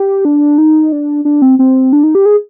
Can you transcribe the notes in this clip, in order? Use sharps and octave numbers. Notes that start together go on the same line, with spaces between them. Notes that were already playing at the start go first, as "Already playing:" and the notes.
Already playing: G4
D4
D#4
D4
D4
C4
C4
D4
D#4
G4
G#4